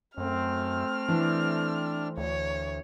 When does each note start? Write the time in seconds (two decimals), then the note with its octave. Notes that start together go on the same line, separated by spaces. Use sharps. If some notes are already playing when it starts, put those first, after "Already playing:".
0.18 F#2 A3 C4 F6
1.09 E3 D4
2.17 D2 C#5